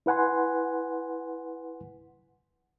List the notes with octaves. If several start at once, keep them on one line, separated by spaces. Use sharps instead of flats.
E4 B4 F#5 G#5 C6